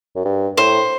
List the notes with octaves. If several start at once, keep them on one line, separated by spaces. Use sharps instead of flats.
F#2
G2
A2 C5